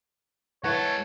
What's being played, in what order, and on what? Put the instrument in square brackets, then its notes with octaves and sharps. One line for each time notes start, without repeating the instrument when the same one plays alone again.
[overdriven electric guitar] G#3 A5 [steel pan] E4 B4 F#5 [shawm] C#5